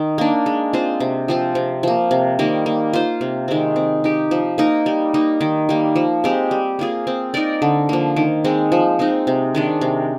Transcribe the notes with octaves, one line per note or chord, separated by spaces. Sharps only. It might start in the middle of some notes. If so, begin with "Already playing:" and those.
Already playing: D#3
A#3 D4
G#3
C4 F4 C5
C3
F3 C4 F4
C3
F3 A#3
C3
D#3 G3 A#3
A#3
F4 C5
C3
D#3 G#3 C4
C4
D#4 G4
F3
A#3 D#4 A#4
G3
A#3 D#4
D#3
G3 A#3
F3
G#3 C4 G4
G3
A#3 F4 G#4
C4
D#4 A#4 D5
D3
F3 A#3
D#3
G#3 C4
F3
G#3 C4 D#4
C3
D#3 G#3 D4
C3